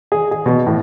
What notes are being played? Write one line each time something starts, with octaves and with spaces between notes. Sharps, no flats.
G#4
G#4
B2
A2